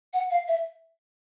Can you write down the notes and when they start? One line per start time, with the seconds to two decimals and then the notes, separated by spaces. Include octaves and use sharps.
0.13 F#5
0.31 F5
0.48 E5